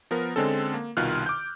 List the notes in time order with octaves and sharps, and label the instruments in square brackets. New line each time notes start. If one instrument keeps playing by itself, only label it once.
[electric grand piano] F3 B3 A#4
D3 G#3 C4 C#4 A4
A#3
C2 B2 D#3 F4 F6 F#6
D6 G6